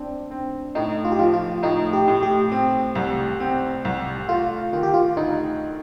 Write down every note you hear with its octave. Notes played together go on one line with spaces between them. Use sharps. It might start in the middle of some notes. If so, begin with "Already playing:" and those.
Already playing: C4 D4
C4
A2 D#4
F4
G4
F3 F4
F4
A2 D#4
G4
A2
G4
C4
C2
C4
C2
A3 F4
D#3 F4
G4
F4
D2 D#4